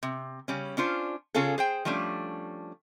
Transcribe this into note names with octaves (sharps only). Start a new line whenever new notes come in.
C3
C#3 G3 C#4
C#4 D4 F4 C5
C#3 C#4 F4 G#4 A4
G#4 C5 G5
F3 G3 A3 C#4 D4